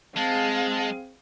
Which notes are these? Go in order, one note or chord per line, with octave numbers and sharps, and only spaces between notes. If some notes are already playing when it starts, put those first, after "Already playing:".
G#3 C4 G#4 F5 A5